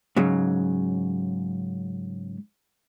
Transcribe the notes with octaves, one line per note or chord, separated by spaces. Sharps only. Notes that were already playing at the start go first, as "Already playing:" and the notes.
G#2 C#3 F#3